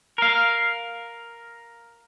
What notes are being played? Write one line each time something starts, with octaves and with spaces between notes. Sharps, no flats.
A#4 F5